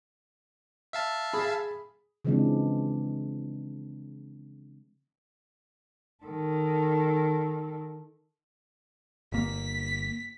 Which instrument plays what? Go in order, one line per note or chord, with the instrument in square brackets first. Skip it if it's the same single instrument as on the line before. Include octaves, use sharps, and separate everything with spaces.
[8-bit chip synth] E5 F5 A5
[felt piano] G#4 B5
[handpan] C#3 E3 F3 G#3 C4 D4
[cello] D#3 A4
[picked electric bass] G1 A#3 [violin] B6